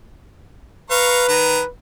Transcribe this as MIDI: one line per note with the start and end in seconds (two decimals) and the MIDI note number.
0.91 1.68 71
0.91 1.24 77
0.91 1.24 82
0.91 1.24 85
1.29 1.60 51
1.29 1.60 82